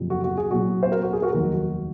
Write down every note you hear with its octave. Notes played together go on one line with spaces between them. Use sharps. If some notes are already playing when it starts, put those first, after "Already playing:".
Already playing: F#1 F2 C3 F3
F#4
F#4
G#4
C2 A#2 F#3 F#4
C5
F#4 A#4
F#4
G#4
F#4 A#4
F1 D#2 D#3 F#3 F#4 A#4
F#4